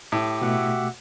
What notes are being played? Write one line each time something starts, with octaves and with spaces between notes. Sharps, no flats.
A2 G4
B2 A3 F#4 E5 F#5